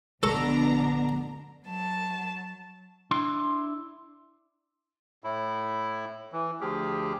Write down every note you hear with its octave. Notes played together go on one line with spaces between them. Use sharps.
A#1 B2 D3 B3 D4 A4 A#5 C#6
F#3 A5
D4 E4 C6
A2 E4
E3
D2 F3 G4 G#4